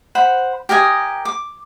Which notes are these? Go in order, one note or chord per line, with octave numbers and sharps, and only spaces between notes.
C5 F#5 B5
G4 A#4 D#5 G#5
D6